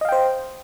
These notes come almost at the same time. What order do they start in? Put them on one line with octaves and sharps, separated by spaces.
D#5 F5 G5 C5